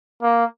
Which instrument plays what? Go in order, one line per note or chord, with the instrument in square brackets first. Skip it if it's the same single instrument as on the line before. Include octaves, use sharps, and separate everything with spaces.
[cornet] A#3